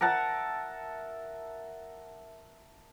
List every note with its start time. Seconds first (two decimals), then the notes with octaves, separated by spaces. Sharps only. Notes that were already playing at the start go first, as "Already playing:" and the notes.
0.01 A#4 E5 F#5 A5